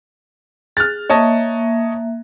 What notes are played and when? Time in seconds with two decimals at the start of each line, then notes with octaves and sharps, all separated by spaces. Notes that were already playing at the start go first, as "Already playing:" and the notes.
0.77 G#4 F6 F#6 A6
1.10 A#3 C#5 D#5 E5 A5